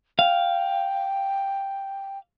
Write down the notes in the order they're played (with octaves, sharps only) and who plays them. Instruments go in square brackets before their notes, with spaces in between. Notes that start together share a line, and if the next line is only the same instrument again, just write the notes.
[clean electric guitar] F5 [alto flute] G5